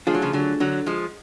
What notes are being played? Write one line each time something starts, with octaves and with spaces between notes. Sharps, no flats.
F3 A3 D4 F4 G#4
F#3
C#3 F3
D3 F#3
D3 F#3
F3 G#3